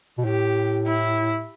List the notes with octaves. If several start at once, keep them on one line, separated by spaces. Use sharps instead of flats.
B2
A2 G4
E4